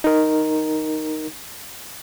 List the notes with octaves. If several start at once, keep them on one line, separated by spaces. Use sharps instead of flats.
D#4 A#4